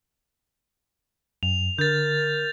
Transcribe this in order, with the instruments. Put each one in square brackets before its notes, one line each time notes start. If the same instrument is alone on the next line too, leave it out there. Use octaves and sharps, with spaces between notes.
[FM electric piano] F#2 [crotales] F7
[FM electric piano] D3 [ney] A#4 [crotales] G6 A6